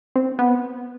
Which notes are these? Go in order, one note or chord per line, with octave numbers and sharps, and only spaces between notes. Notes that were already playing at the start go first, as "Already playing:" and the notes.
C4
B3